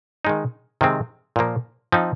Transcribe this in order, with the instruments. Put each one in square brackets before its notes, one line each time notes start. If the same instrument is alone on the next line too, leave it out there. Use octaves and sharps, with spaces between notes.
[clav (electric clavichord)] D#3 G#3 D#4
C3 D#3 G#3 C4
A#2 F3 A#3
F3 C4 D#4